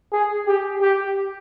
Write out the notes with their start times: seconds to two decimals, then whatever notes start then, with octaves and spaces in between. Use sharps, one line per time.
0.12 G#4
0.47 G4
0.82 G4